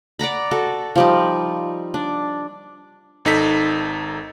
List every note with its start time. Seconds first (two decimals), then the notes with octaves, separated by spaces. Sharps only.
0.19 D5 F#5 A#5 B5
0.51 F#4 A4
0.96 F3 G3 D#4
1.94 D4
3.25 G#1 D#4 A4 B6